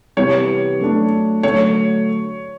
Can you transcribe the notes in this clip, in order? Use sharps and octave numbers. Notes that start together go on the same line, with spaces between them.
C3 E3 G3 B3 C#5
F#3 A3 D4
D3 F#3 A3 C#5